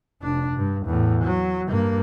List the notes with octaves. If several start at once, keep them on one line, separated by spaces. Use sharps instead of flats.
F1 D4
G2
E2 A2
F#3
G2 A#3